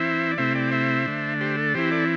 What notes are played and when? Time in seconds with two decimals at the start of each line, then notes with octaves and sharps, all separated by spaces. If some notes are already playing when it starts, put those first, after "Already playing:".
Already playing: E3 C4 E4 C5 E5
0.31 D5
0.38 C3 A3 C4 E4 C5 E5
0.55 D5 G5
0.71 C5 E5
1.06 D3 A3 D4
1.41 G4 C5
1.57 A4
1.74 E3 C4 E4 G4 C5
1.91 A4 D5